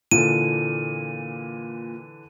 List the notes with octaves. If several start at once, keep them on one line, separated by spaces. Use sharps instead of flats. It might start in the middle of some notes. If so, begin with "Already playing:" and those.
A#2 D3 E3 D#7